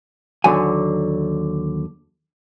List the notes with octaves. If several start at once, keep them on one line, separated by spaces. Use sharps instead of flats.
D#2 D3 F#3 F#5 G#5